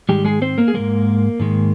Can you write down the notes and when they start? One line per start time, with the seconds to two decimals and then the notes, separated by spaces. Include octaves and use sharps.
0.09 G#2 D#3 G3 G#3 G4
0.25 G#3 G#4
0.42 C4 C5
0.58 A#3 A#4
0.68 G#4
0.74 G#2 D#3 G#3 A#3 A#4
1.40 G#2 D#3 G#3